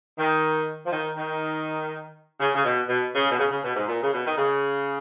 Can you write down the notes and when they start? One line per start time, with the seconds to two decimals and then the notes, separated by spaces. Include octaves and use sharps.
0.18 D#3
0.86 F3
0.92 D#3
1.17 D#3
2.40 C#3
2.55 C#3
2.65 B2
2.89 B2
3.14 C#3
3.32 B2
3.39 C#3
3.51 C#3
3.64 B2
3.76 G#2
3.88 A#2
4.03 C#3
4.12 B2
4.27 D#3
4.38 C#3